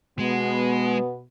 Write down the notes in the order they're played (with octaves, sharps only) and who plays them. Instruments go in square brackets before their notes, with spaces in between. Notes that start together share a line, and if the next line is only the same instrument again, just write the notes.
[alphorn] B2 [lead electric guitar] G#3 [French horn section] B3